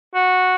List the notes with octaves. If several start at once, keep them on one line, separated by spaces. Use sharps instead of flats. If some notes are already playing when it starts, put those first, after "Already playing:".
F#4